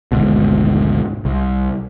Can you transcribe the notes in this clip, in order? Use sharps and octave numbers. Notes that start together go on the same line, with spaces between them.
G#1 D2 G#2 B2
C2